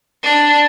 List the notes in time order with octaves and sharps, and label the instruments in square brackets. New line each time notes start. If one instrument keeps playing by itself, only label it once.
[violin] D4